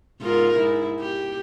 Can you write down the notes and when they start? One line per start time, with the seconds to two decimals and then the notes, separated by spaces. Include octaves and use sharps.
0.21 G#2 F4 A#4
0.57 G#2 E4
1.00 G4